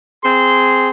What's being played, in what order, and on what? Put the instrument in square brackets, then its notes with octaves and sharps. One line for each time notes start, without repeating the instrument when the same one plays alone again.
[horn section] C4 G#4 C6